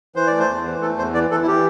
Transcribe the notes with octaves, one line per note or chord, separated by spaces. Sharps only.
E3 C5
A3 D5
C5
E2
E3
A3 A4
E2 C5
E3 D5
E3 A4
E4
E3 G4